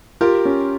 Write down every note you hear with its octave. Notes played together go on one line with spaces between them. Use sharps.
F4 G4 A#4
C#4